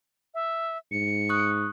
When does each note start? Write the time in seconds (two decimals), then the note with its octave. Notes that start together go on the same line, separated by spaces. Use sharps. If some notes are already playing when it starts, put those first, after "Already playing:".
0.34 E5
0.92 G#2 C#7
1.29 C#6 D#6 F#6